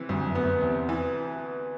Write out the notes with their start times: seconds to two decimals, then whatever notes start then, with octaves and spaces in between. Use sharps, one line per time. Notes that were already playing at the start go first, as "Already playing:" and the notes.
Already playing: C3 E3
0.09 D2 G2
0.27 F#2
0.35 B3
0.45 F#2
0.62 E2 C3
0.89 E3